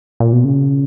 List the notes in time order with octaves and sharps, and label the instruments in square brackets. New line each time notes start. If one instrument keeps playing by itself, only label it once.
[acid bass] A#2
B2
C#3